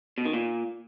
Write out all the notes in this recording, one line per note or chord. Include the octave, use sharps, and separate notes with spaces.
B2
D#3
A#2